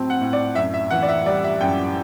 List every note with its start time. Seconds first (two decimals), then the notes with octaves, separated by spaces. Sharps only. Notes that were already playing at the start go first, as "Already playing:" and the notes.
Already playing: A2 F#3 C4 A5
0.10 F#5
0.21 A2
0.33 D5
0.55 F#2 E5
0.74 E5
0.90 E3 F#5
1.02 D5
1.09 E5
1.26 G3 D5
1.44 E5
1.61 F#2 G5